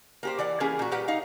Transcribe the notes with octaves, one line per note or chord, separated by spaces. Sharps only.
A#3 G4 C5
E3 D5 F#5
E3 A#3 C#4 G4 G#4
A#2 F#4
A#2 G3 G4 B4 F#5
D#4 F5